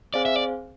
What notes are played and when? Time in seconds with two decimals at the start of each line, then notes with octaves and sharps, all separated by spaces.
0.14 C4 G#4 C5 D5 F5 G#5
0.26 E5
0.36 D5